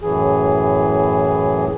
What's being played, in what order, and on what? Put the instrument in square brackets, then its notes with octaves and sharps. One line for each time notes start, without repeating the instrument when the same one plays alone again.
[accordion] F#2 A2 E3 G#4